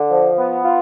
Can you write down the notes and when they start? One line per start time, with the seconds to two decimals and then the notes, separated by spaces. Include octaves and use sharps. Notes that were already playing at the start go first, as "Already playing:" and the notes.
Already playing: D3
0.11 F3
0.38 B3
0.64 F4